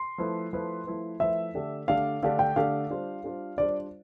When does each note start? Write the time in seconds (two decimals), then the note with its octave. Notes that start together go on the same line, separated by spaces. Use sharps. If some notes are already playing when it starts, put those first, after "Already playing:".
Already playing: C6
0.18 F3 A3 E4 B4
0.53 F3 A3 E4 B4
0.87 F3 A3 E4 B4
1.20 F3 A3 E4 B4 E5
1.54 D3 A3 D4 G4 D5
1.88 D3 A3 D4 G4 D5 F5
2.23 D3 A3 D4 G4 D5 F5
2.39 G5
2.56 D3 A3 D4 G4 D5 F5
2.90 G3 D4 F4 C5
3.24 G3 D4 F4 C5
3.58 G3 D4 F4 C5 D5